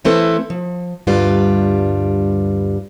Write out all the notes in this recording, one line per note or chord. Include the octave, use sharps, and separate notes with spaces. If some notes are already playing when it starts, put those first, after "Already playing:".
E3 A3 C4 E4 A4 B4
F3
D2 G2 G3 D4 F4 B4